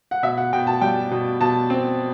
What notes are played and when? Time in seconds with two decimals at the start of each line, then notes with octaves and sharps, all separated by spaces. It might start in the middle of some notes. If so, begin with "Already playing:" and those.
0.11 F#5
0.23 B2 E5
0.37 F#5
0.53 B2 G5
0.67 A5
0.81 G3 G5
1.11 B2
1.41 B2 A5
1.70 C4